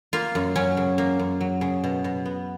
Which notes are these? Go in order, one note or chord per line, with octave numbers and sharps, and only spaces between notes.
A#3 F4
F#2
F#3 C#4
C#3
A#3
F#2
F#3
C#3
B2
B2
B3